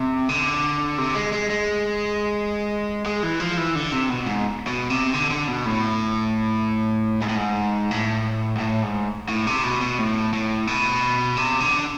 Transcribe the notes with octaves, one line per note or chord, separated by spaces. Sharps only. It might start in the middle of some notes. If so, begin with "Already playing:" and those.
Already playing: C3
D3
C3
G#3
G#3
G#3
G#3
E3
F3
E3
D3
C3
B2
G#2
B2
C3
D3
D3
B2
A2
G#2
A2
G#2
A2
G#2
A2
G#2
A2
C3
B2
B2
A2
A2
B2
C3
D3